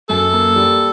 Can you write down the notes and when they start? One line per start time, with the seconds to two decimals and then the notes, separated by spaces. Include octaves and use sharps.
0.09 F#2 A4
0.33 A#3
0.56 G3